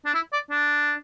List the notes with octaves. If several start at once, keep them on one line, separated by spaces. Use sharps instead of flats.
D4
E4
D5
D4